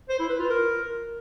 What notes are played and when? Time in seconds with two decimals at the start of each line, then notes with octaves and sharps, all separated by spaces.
0.09 C5
0.19 E4
0.29 B4
0.39 F4
0.49 A#4